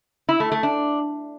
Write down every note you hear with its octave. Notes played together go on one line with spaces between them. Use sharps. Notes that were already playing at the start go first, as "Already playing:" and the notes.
E4
A3
A3
D4